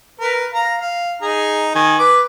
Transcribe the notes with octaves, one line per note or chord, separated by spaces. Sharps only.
A#4 B4
F5 A#5
F5
D#4 G#4 A#5
D#3 G#5
B4 D6